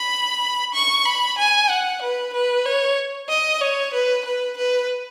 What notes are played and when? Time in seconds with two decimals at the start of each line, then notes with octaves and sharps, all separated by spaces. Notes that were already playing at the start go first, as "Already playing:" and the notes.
Already playing: B5
0.74 C#6
1.05 B5
1.38 G#5
1.69 F#5
2.02 B4
2.33 B4
2.65 C#5
3.29 D#5
3.61 C#5
3.93 B4
4.25 B4
4.57 B4